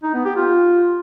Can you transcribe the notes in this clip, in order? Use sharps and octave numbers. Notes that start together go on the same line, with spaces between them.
D#4
B3
G4
F4